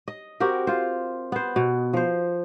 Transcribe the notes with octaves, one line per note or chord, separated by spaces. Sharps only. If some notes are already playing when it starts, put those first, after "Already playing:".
D#5
C4 F#4 G4 A#4
F4 C5
B3 C5
B2
F3 C5